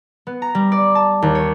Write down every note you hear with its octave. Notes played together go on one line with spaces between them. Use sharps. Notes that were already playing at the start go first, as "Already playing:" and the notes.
B3
A#5
G3
D5
A5
D#2
C#5